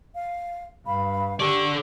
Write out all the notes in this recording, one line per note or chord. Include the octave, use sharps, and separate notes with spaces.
F5
G2 F5 B5
D3 G4 A4 D5 C#6